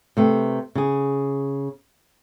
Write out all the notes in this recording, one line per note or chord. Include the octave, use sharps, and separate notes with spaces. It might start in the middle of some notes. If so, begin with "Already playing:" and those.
C3 A3 B4
C#3 G#4